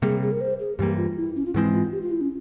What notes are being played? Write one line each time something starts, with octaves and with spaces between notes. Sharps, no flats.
C3 G3 A#3 G#4
G#4
A#4
C5
G#4
G2 E3 G3 A#3 G4
F4
E4
C#4
F4
G#2 E3 G#3 C4 E4
F4
G4
F4
E4
C#4